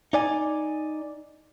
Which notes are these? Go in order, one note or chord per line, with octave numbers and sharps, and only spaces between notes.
D#4 D5 G#5